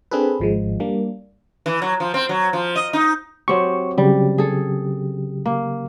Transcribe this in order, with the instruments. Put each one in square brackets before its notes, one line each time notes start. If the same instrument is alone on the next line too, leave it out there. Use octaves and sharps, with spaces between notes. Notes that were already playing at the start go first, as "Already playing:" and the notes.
[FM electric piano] C4 D4 G#4 A4 B4
G#1 F3 G#3
G3 A#3 D4
[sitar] E3
F#3
F3
C4
F#3
F3
D#5
D#4
[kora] F#3 C4 G4 [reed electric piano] C#6
[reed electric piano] C#3 F#3 G4 [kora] G3
[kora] G#4 A4
A#3